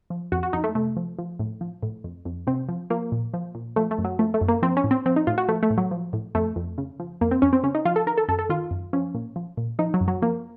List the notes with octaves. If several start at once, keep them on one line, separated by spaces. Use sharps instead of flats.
F3
F2 F#4
F#4
F2 D#4
A3
C3 A3
F3
F3
A2
F3
A2
F2
F2
C3 C4
F3
F3 A#3
A#2
F3
A#2
F3 A3
A3
F#2
F#3
F3 A3
A3
F#2
A#3
F3 C4
C#4
A2
C4
F3 C4
D#4
A2 F4
F#4
F3 A3
A3
A2
F#3
F3
A2
F2 A3
F2
C#3
F3
F2 A#3
C4
F2 C#4
C4
C#3 C#4
D#4
F3 F4
A4
D#3 A#4
A4
F#2 A4
A4
D#3 F4
F#2
F3 C#4
A#2
F3
A#2
F3 D#4
F#3
F#2
F#3
F3 A#3